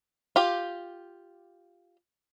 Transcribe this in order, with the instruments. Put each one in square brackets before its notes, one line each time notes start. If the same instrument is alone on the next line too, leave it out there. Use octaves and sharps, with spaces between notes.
[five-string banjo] F4 G4